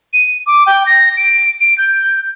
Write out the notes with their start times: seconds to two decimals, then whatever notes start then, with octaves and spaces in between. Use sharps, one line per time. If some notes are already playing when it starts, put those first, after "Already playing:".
0.13 D#7
0.47 D6
0.66 G5
0.86 A#6
1.17 D7
1.60 D7
1.78 G6